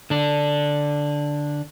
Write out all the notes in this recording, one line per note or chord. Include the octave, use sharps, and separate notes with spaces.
D3 D4